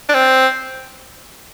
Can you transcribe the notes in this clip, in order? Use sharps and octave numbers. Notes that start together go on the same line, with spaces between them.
D4
C4